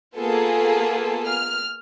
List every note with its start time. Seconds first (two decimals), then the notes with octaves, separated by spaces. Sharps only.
0.17 A#3 B3 F4 G#4 A4
1.27 F6